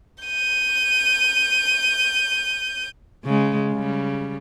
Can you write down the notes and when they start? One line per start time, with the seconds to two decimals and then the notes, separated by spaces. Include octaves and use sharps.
0.24 G6 D#7
3.25 C#3 G#3
3.72 C#3 G3